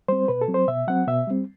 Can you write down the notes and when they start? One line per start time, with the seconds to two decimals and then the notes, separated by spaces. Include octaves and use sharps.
0.08 G3 C4 C5
0.28 B2 B4
0.41 A4
0.48 F#3 C4
0.54 C5
0.68 B2 E5
0.88 F#3 C4 F#5
1.08 B2 E5
1.27 G3 C4